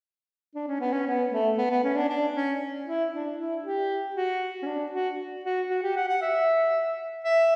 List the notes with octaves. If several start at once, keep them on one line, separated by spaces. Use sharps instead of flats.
D4
C#4
B3
C#4
B3
A3
B3
B3
C#4
D4
D4
C#4
E4
D4
E4
G4
F#4
C#4
D4
F#4
F#4
F#4
G4
F#5
F#5
E5
E5